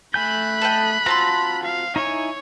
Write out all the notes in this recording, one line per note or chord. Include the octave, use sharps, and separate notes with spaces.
A3 G#5 B5 F#6 G6
A4 D#5 G5
C4 F4 F#4 A5 A#5 C6
F5
D#4 E4 C#5 G#5